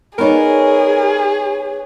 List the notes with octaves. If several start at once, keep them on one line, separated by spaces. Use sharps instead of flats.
B3 D#4 G#4 A#4 B4 C#5 D5